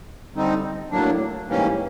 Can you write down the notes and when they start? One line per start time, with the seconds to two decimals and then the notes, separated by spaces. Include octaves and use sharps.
0.35 D3 G3 C4 D#4
0.91 A2 F#3 A#3 D4
1.47 G#2 E3 G3 A#3 C#4